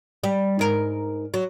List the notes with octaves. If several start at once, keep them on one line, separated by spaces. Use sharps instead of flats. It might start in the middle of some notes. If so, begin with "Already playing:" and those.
G3
G#2 A#4
F#3